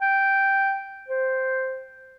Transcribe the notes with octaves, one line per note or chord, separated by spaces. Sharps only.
G5
C5